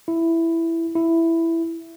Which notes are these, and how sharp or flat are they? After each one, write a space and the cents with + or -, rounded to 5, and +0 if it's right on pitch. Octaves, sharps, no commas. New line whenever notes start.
E4 +5
E4 +5